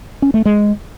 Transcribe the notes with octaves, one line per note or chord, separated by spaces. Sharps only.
C#4
A3
G#3